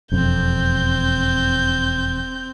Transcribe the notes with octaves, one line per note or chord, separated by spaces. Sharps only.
E1 F2 C4 G6